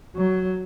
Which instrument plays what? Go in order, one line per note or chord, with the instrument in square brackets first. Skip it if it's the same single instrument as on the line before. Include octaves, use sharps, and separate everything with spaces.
[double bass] F#3